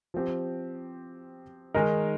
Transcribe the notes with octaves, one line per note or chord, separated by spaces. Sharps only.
F3 C4 G4
D#3 G#3 D#4 A#4